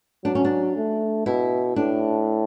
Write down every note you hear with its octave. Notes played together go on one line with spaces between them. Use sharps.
F#3 D4
C#4
D4
A3
B2 E4
A2 D4